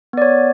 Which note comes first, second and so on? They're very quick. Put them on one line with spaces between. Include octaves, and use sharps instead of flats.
B3 D5 C#5